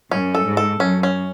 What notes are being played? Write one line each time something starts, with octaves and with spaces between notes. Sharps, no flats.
F#2 C#4
A4
G#2
A4
F#2 C#4
C#4